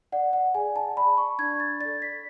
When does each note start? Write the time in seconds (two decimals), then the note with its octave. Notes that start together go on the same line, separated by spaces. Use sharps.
0.12 D5 F#5
0.33 F#5
0.55 G#4 G#5
0.76 A5
0.97 D5 B5
1.18 C#6
1.39 D4 G#6
1.60 A6
1.80 A4 D5 A6
2.02 B6